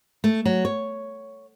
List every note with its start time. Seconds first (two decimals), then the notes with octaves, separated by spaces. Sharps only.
0.24 A3
0.45 F#3
0.65 C#5